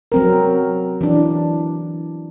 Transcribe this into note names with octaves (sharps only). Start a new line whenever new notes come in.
F#3 C4 A#4
E3 D4